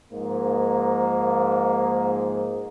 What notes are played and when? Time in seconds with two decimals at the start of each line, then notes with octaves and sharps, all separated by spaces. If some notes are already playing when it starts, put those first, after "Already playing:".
0.13 G#2 F3 A#3